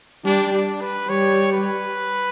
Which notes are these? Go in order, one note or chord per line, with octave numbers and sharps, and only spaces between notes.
G3 D4
D4
B4
G3 C#5
B4